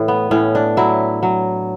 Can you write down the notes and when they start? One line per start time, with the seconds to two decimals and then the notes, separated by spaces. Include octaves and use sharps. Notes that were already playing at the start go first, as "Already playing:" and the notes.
Already playing: A2 E3
0.08 B3
0.31 A2 C#4
0.55 D4
0.77 F#3 E4
1.23 F#3